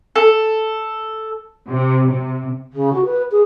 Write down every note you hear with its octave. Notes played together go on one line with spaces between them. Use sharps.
A4
C3
C3
C#3
F#4
B4
G#4